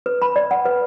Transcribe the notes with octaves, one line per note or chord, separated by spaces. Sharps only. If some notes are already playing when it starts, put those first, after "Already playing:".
B4
B5
D5
F#5
B4